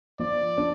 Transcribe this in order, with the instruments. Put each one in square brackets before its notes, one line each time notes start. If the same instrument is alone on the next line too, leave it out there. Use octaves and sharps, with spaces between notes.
[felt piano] F3 [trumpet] D5
[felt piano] D4